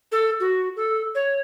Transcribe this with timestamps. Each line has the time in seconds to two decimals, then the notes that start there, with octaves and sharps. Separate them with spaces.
0.12 A4
0.40 F#4
0.76 A4
1.15 C#5